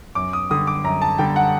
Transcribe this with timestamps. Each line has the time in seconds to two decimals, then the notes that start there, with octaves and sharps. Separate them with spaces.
0.15 F#2 D6
0.33 D#6
0.50 D3 G3 D#6
0.67 D6
0.84 F#2 A#5
1.02 A5
1.18 D3 G3 G5
1.36 F#5